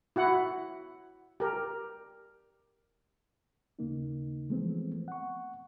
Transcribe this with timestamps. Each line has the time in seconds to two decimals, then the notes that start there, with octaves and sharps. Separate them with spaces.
0.16 E4 F#4 F#5
1.40 G4 A#4
3.79 D#2 C#3 A#3 D#4
4.49 E3 F3 G#3 A3 B3 C4
5.08 F#5 C#6